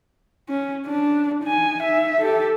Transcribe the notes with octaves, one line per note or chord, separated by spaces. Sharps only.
C#4
D4
D#4 G#5
D#4 E5
G4 A4